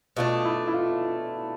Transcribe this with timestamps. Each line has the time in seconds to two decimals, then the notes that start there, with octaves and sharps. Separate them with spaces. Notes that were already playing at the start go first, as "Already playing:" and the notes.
0.17 B2 A3 D4 F4
0.45 E4
0.67 E4
0.73 F4